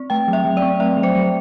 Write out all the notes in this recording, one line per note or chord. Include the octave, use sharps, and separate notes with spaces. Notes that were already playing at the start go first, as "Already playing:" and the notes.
Already playing: C4
A3 G5
F#3
E5
F#3
D5
C4
A3 E5
F#3
C5
F#3